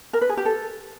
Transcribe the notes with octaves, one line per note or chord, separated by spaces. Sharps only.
A#4
B4
G#4
G4
A4